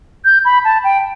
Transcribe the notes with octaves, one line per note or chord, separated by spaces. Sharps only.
G6
B5
A5
G5